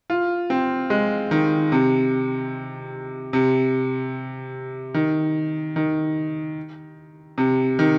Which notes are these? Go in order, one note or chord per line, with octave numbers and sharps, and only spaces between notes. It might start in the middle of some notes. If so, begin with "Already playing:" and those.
F4
C4
G#3
D#3
C3
C3
D#3
D#3
C3
D#3